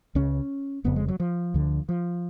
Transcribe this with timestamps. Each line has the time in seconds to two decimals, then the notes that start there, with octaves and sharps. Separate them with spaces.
0.15 C#2 C#3 C#4
0.84 F1 F2 C#3 B3
0.96 G#3
1.08 F#3
1.20 F3
1.54 D2 D3
1.89 F3